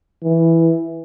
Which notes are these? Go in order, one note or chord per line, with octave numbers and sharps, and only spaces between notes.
E3